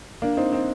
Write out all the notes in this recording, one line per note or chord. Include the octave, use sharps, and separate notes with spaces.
A#3 D4
C4 D#4
C4 D#4